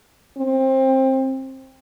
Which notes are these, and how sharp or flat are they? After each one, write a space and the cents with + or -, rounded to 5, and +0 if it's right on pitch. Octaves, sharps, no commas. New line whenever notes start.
C4 +20